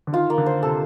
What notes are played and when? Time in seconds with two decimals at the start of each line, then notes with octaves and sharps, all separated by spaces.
0.07 D3
0.13 D#3 F4
0.30 A#3
0.38 D3
0.46 C5
0.63 C3 A4